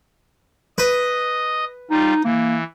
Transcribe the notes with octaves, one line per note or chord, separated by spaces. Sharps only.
B4 D#5
G3 D#4 F4
E3 A#3